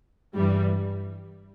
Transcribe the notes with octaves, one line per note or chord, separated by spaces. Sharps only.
G2 E3 G3